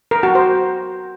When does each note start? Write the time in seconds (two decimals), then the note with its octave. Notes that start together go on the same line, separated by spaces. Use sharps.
0.11 A#4
0.23 F#4
0.35 C5